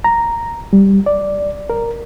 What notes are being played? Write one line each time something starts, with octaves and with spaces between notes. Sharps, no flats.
A#5
G3
D5
A#4